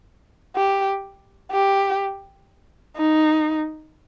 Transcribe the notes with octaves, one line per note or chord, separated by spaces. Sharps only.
G4
G4
D#4